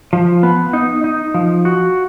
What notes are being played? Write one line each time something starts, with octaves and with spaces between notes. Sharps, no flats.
F3
B3
D#4
D#4
F3
F#4